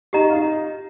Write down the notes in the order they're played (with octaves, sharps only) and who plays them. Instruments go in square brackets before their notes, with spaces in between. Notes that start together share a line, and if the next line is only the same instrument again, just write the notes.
[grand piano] D#4 [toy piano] G4 D#5 A#5
[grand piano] F4
D#4